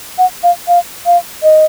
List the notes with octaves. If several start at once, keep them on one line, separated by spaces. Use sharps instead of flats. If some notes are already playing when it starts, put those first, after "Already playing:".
F#5
F5
F5
F5
D#5